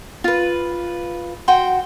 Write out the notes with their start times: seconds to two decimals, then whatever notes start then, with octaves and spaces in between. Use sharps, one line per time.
0.24 F4 B4
1.48 F#4 F#5 G5 C6